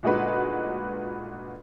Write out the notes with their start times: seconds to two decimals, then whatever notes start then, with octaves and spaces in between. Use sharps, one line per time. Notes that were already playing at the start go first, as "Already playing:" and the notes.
0.03 G1 A#2 G#3 D#4 F#4 B4